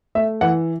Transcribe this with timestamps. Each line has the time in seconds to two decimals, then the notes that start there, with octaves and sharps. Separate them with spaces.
0.15 A3 E5
0.41 E3 F#5